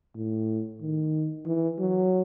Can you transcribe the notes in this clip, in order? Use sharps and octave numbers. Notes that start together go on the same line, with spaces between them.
A2
D#3
E3
F#3